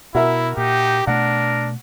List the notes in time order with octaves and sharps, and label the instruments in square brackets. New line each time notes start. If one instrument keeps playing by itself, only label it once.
[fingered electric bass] B2 [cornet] E4 [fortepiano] F#4 A#4 E5
[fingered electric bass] A#2 [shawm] D#4 [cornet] G4
[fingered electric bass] B2 A3 [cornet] D4 [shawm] A#4 [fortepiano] F#5